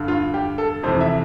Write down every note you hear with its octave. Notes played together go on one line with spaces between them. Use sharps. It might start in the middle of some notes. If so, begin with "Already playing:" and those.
Already playing: G2 D3
F4
G4
A4
F2 C3 E3 C5
E5